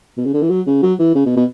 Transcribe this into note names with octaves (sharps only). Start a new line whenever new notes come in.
B2
C#3
D3
E3
F#3
C#3
F#3
E3
C#3
B2
B2